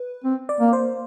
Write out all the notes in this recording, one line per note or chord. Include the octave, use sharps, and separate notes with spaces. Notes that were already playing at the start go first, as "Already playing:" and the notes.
Already playing: B4
C4
D5
A#3
C5